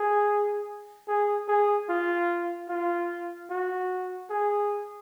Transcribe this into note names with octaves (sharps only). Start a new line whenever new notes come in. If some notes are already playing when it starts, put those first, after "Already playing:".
Already playing: G#4
G#4
G#4
F4
F4
F#4
G#4